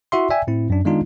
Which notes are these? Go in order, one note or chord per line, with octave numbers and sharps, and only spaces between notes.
E4 F#4 E5 C6
D5 E5 G5 G#5
A2 C4 E4
F#2 D4
D#3 G#3 B3 D4 D#4 F4